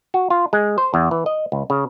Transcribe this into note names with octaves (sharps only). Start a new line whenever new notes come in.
F#4
F4
G#3
C5
E2
E3
D#5
C#2
C#3